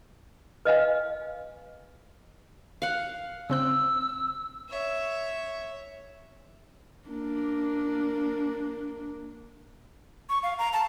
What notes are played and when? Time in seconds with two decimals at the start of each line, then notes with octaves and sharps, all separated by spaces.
0.65 B4 D#5 F5 G#5
2.82 F5 F#5
3.50 C#3 C4 E6 F#6
4.69 C#5 E5
7.08 A#3 D4
10.29 C#6
10.43 F5
10.59 A#5
10.73 A5